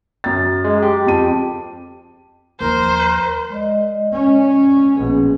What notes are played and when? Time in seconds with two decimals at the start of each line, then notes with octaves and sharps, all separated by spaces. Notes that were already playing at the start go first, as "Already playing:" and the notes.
0.24 F#2 A6
0.64 G#3
0.82 G4
1.06 F2 A5 D#7
2.61 D#2 F3 A#4 C5
3.50 G#3 D5 D#5
4.12 C#4
4.95 A#1 B2 C#4 G#4